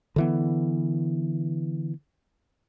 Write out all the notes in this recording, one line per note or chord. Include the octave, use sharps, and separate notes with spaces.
D3 E3 B3